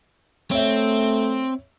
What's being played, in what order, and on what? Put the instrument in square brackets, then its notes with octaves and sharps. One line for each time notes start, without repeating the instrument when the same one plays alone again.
[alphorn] A3 [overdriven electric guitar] C4 [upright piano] C#5 E5